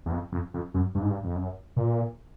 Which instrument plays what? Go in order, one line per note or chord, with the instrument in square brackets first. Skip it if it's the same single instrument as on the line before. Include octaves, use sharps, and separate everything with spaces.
[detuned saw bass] E2
F2
F2
F2
F#2
G2
G#2
G2
F2
F#2
A#2